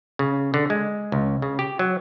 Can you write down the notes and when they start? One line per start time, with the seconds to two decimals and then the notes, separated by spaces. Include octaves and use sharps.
0.19 C#3
0.54 D3
0.70 G#3
1.12 C#2
1.42 C#3
1.59 G4
1.79 F#3